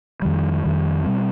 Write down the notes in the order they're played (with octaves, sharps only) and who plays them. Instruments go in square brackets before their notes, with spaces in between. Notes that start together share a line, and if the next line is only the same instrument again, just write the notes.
[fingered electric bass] F2 D#3 G3
F2 D#3 G3
B2 G3 C4